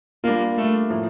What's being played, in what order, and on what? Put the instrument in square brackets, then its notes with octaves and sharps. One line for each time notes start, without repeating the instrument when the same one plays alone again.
[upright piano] G3 D4 F4 [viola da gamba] A#3
[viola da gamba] A3
[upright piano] A2 F3 A#3